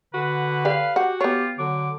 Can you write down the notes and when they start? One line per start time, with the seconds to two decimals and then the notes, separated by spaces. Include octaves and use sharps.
0.14 D3 F#4 B4
0.65 G4 D5 F5
0.96 F#4 G4 F#5
1.21 B3 F4 G4 C#5
1.59 D3 F#3 D6